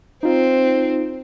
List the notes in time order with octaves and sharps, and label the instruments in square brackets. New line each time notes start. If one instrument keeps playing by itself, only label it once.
[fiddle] C4 [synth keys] D#4 F4